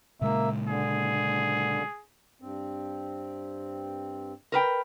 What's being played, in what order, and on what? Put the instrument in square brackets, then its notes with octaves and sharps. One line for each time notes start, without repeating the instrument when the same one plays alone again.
[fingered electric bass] A#2 C#3 G#3 [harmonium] A#3 E5
[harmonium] D3 [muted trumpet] G#4
[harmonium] G2 C4
[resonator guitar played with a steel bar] A#4 B4 G5